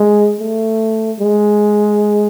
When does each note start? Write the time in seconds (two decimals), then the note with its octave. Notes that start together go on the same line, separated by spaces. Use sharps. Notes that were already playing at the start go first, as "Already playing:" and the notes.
Already playing: G#3
0.40 A3
1.20 G#3